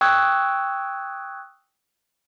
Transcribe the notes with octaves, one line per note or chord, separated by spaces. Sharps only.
G5 C#6 D#6 E6 F#6 G#6